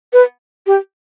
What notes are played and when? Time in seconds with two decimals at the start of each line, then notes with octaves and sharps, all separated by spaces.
0.13 B4
0.67 G4